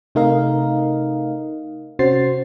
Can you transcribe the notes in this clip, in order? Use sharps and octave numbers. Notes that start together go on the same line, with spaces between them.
C3 A3 D#4 A#4 D#5 F5
C3 C#4 F#4 C5 A6 C7